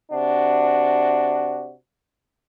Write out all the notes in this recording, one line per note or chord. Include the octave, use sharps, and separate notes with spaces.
C3 D4 F#4